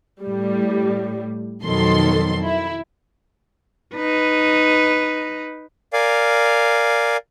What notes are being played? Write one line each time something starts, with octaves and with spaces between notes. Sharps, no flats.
A2 G3
F2 B2 D#3 F#3 A4 C6
E4
D#4 B4
A#4 D5 F5 G#5